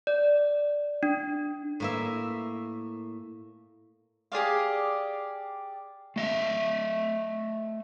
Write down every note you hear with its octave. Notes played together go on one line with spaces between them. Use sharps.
D5
D4
A2 A#3 E5
G4 G#4 D5 F5
A3 D#5 E5